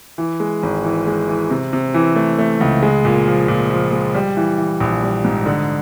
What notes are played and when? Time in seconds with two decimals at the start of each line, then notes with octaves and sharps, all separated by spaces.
0.18 E3
0.40 G#3
0.63 G#1
0.85 E3
1.07 G#3
1.28 E3
1.50 C3
1.73 C3
1.94 E3
2.16 A3
2.38 A3
2.61 C#2
2.83 G#3
3.05 A#2
3.27 F3
3.48 A#2
3.70 F3
3.92 G#3
4.15 G3
4.37 E3
4.58 E3
4.80 A#1
5.03 G3
5.25 G#2
5.46 D3